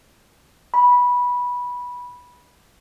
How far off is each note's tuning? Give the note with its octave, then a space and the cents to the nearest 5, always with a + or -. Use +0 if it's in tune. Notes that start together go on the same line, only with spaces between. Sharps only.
B5 -15